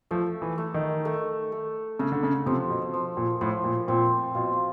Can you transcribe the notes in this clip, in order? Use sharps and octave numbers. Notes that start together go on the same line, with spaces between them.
F3 A3
E3
A3
D#3
A3
A3
C#3 A3
D3
C#3
C3 F3
B2
F3
A#2
A2 F3
A#2
A#2 C4
B2 F4